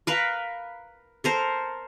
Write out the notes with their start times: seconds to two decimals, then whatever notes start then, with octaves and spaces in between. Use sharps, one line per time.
0.07 A#4 B4 F5
1.24 A4 A#4 C5